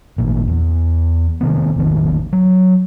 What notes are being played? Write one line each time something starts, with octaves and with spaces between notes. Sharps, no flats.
G#1 A#2
E2
C3 D#3 B3
E1 A1 D#3
F#3